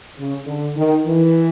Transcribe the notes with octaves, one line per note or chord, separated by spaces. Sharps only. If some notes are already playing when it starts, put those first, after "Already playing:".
C#3
D3
D#3
E3